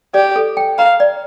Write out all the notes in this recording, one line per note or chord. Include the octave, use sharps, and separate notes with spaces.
G4 D5
A4
G5
F5 A#5
D5